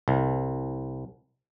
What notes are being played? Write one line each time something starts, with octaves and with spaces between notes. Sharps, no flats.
C2